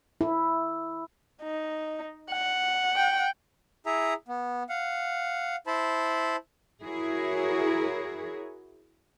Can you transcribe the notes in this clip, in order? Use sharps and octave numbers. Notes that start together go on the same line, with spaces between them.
E4
D#4
F#5
G5
E4 G#4 E5 A#5
B3
F5 F#5
E4 C5 A5 B5
E4 F#4 G#4 A#4 C#5